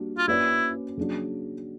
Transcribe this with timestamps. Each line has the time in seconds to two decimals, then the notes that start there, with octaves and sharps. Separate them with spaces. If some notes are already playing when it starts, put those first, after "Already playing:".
Already playing: G3 A#3 D4 F#4
0.18 F4
0.28 A#3 C#4 E4 F#4 B4 D5
0.97 C#3 F#3 A#3 D4 F#4